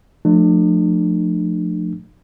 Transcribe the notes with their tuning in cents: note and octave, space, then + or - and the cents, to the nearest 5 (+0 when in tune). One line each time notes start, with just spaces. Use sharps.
F3 +20 A3 +0 D4 +40